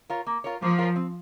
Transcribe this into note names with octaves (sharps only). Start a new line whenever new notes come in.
F4 A#4 C#5
A#3
F4 A#4 C#5
F3 A#3
F4 A#4 C#5
C4